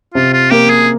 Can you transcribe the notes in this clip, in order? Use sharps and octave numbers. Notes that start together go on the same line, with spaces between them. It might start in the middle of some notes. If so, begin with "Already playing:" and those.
C3 F4
F4
A#3 G4
G#4